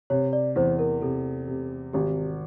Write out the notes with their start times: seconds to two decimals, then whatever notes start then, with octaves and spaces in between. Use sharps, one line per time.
0.10 C3 C#5
0.33 D5
0.56 E2 C5
0.79 A#4
1.01 C3 A4
1.48 C3
1.93 G#1 G4